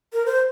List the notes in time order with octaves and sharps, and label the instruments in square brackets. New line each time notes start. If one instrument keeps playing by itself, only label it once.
[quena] A#4
C5